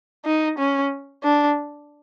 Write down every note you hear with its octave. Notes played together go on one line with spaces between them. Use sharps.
D#4
C#4
D4